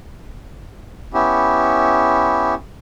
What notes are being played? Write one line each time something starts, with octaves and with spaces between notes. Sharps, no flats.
B3 C#4 E4 G4